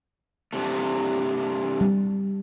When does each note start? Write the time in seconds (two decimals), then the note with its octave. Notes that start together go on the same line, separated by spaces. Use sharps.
0.53 G2 C3 A3
1.81 G3